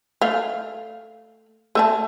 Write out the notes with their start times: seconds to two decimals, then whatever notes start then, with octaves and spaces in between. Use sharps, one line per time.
0.21 A3 F5
1.75 A3 E5 A5